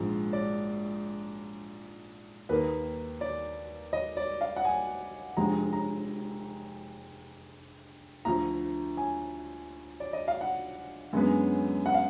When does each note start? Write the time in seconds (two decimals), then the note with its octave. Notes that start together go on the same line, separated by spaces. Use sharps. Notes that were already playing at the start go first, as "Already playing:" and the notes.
Already playing: A#1 G#2 F3
0.33 D5
2.49 D#2 D#3 A#3 B4
3.21 D5
3.93 D#5
4.17 D5
4.41 F5
4.56 F#5
4.65 G#5
5.37 F1 F2 D3 G#3 A#5
5.73 A#5
8.25 D2 D3 F3 A#5
8.97 G#5
10.00 D5
10.13 D#5
10.28 F5
10.41 F#5
11.13 F#2 D3 G#3 B3
11.86 F#5
11.94 F5